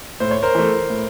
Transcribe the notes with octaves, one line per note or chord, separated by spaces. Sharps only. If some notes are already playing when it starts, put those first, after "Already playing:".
A2 C5
C#5
A#4 C5
E3 A3
A2